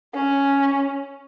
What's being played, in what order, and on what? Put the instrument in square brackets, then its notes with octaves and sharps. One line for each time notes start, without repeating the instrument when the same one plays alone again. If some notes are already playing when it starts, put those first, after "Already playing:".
[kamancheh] C#4